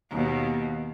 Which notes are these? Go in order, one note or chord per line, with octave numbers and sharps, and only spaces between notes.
D#2 B2